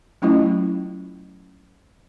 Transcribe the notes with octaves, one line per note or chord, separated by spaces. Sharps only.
F#3 A3 C#4 E4 F4 D#5